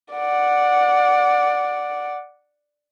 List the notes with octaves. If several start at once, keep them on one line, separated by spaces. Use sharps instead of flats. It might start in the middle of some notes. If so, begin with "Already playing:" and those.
D5 F#5